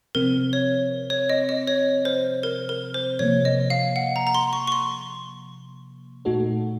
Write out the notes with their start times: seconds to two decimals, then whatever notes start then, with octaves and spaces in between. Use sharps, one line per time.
0.15 C3 F3 C4 A#4
0.53 C#5
1.10 C#5
1.29 D#5
1.49 D#5
1.68 C#5
2.05 C5
2.43 A#4
2.69 A#4
2.94 C5
3.19 C3 F3 A#3 C#5
3.45 D#5
3.70 F5
3.96 F#5
4.16 A#5
4.27 A#5
4.35 C6
4.53 C#6
4.67 C#6
4.72 C6
6.25 A#2 A3 D#4 F#4 A4